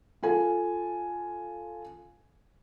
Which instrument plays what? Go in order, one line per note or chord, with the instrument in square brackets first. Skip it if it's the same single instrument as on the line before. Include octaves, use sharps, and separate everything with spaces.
[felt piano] F4 A4 G#5